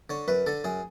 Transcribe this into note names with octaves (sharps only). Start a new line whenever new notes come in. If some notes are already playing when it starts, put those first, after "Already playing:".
D3 C#5
F#2 B4
D3 A4
F#2 G#4